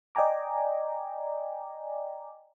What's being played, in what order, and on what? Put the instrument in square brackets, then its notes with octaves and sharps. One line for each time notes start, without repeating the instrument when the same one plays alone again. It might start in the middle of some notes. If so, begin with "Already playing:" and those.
[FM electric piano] D5 D#5 G5 G#5 A#5 D6